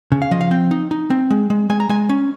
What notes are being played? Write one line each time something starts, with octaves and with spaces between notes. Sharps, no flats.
C#3
F5
F3 D#5
F5
C4 G5
D#4
D#4
C4
G#3
G#3
G#3 G#5
A#5
G#3 G#5
C#4